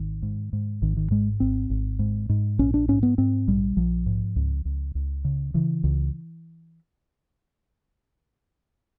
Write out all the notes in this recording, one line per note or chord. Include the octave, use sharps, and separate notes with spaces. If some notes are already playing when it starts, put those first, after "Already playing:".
Already playing: G#1 D#3
G#2
G#2
G#1 D#3
D#3
G#2 G#3
G#1 C4
G#1
G#2
G#2
A#1 C#4
D4
G#2 C#4
B3
G#2 C4
A#1 G3
A#1 F3
G#2
C#2
C#2
C#2
C#3
C#3 E3
C#2